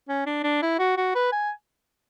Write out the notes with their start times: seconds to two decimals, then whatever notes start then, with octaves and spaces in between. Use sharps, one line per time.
0.09 C#4
0.26 D4
0.43 D4
0.62 E4
0.79 F#4
0.97 F#4
1.15 B4
1.32 G#5